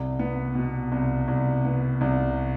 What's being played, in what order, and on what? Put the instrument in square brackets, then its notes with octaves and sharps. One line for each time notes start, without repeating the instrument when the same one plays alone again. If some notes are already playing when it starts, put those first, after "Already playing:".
Already playing: [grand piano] C2
B3
B2
C2
C2
B3
C2